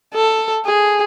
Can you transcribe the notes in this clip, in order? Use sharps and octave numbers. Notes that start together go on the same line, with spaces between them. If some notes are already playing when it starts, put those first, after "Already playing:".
A4
G#4